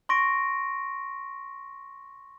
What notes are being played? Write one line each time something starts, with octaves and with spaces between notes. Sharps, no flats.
C6 C#6 A#6 D7